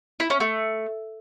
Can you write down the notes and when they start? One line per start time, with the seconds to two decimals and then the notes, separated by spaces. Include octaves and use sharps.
0.20 E4
0.30 C#4
0.40 A3